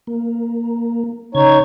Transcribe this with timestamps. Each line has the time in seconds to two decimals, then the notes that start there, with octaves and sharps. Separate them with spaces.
0.07 A#3
1.35 C#3 D#4 C#5 G#6